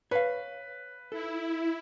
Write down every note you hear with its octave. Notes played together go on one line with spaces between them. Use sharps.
B4 C#5 F5
E4 A4